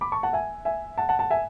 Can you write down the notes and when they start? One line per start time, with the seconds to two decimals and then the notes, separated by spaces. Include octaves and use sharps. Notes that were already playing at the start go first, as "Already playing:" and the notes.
0.01 B5 D6
0.12 A5 C#6
0.23 F#5 A5
0.33 E5 G#5
0.65 E5 G#5
0.98 F#5 A5
1.09 F#5 A5
1.19 F#5 A5
1.31 E5 G#5